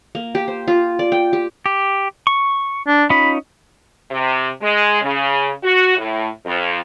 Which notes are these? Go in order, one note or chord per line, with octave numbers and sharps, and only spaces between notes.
A#3
G4
C5
F4
D5
G5
G4
G4
C#6
D4
C#4 D#4 F4 B5
C3
G#3
C#3
F#4
A2
F2